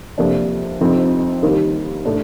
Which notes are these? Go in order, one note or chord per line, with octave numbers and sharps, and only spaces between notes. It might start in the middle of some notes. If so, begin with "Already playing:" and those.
F2 C3 F3 A#3 D4
F2 C3 F3 C4 D#4
D#2 D#3 G3 A#3 D#4
A2 A3 D4